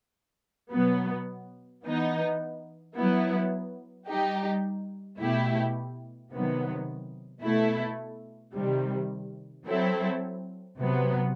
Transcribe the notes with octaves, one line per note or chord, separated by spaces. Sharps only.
B2 F#3 B3
E3 B3 D#4
F#3 B3 E4
G3 D#4 G4
B2 A3 E4 G4
C3 D#3 F#3 B3
B2 A3 E4 A4
C3 D#3 G3
F#3 C4 E4 A4
C3 F#3 B3